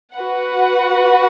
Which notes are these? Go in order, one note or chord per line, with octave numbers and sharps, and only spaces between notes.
F#4 B4 F#5